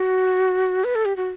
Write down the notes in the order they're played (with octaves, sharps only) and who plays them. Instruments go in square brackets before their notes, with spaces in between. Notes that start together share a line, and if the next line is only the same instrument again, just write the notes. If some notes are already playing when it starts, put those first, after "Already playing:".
Already playing: [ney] F#4
B4
A4
G4
F#4